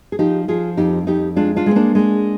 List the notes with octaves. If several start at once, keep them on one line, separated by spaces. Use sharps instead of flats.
G#4
F3 D#4 G4
F3 F4 G#4
F2 D#4 G4
F2 D#4 G4
G#3 D4 F4
D4 F4
G#3 C4
A#3 D4
G#3